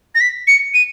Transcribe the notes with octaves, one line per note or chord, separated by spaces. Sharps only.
A#6
B6
C#7
D#7